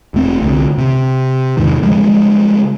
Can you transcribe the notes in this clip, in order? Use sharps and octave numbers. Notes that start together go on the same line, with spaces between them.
E1 A3 C4
C2 D3
C3
E2 G#2 C3 D#3
C#3 F3 G3 G#3